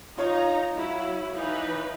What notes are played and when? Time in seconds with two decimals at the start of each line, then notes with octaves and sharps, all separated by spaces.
0.18 D#4 F4 C#5 F5 A#5
0.75 F#3 E4
1.34 E3 D#4 B4